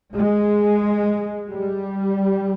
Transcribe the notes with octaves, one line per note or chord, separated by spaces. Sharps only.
G#3
G3